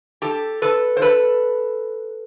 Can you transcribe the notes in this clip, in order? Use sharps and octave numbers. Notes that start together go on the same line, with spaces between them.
G4 A4
A4 B4
C5
A4 B4